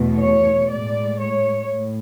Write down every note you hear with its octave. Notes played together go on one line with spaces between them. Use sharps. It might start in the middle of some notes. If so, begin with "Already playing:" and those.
Already playing: E2 B2 A3
C#5
A2 G#3 D5
C#5
A2